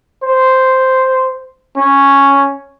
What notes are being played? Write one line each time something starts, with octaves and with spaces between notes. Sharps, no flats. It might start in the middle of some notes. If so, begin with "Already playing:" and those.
C5
C#4